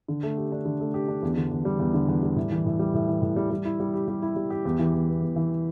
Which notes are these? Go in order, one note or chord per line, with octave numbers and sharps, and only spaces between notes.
D3
A3
G4
D4
D3
A3
G4
D4
E2
D3
E2
G3
E2
D3
E2
G3
A2
E3
A2
G3
A2
E3
A2
G3
G3
E4
G3
G4
G3
E4
G3
G4
E2
E3
E2
B3
E2
E3